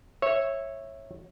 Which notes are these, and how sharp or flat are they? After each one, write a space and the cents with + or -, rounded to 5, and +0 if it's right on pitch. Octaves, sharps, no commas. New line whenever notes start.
C#5 -15 E5 +0